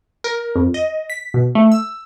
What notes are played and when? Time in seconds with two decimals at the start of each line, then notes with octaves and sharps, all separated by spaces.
0.24 A#4
0.56 F2
0.74 D#5
1.10 B6
1.34 B2
1.55 A3
1.72 E6